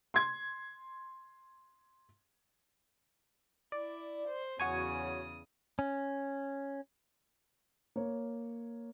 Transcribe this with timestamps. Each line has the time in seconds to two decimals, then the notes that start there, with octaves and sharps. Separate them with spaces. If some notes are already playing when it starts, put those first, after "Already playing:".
0.14 C6 G#6
3.72 E4 D5
4.27 C5
4.60 E2 C#3 F#4 C#5 G#5 D#6
5.79 C#4
7.96 A#3 C#5